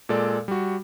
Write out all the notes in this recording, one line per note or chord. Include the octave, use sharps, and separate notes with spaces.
A#2 G#3 A4 D5
G3 F#4